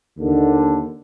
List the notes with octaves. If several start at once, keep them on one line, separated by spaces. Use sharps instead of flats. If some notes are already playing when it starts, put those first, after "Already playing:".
D#2 D3